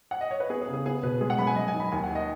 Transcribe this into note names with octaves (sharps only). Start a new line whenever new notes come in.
F#5
D#5
C#5
B4
B3 G#4
G#4
C#3
G#4
B3 G#4
B2 B4
G#3 G#4
F#5
F#2 B5
G#5
F#2 D#5
G#5
D#3
B5
D#2 G#5
F#5
D#3
D#5